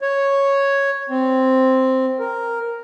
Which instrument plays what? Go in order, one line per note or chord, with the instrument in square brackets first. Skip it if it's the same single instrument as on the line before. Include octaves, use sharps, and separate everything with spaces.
[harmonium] C#5
C4
A#4